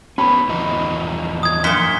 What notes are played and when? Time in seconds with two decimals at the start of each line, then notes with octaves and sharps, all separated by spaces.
0.18 B3 C#4 B5
0.49 E2 F3 D#4
1.43 D#6 G#6
1.64 F#2 A#2 B6 G7